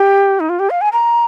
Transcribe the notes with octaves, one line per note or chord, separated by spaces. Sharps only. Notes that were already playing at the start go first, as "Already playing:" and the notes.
Already playing: G4
D#4
F4
G4
F5
G#5
A#5